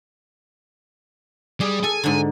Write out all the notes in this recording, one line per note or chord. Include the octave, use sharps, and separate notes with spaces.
G3 G#4
A4 G#5
G#2 D3